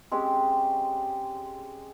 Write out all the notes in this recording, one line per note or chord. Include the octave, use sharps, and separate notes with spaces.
G#3 C4 C#4 G4